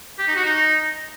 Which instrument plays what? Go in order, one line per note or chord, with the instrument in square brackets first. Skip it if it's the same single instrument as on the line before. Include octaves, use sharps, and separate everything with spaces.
[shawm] G4
D#4
F#4
D#4